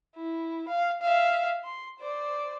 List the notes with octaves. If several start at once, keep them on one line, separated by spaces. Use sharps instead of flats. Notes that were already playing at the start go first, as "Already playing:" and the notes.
E4
F5
E5 F5
C6
C5 D5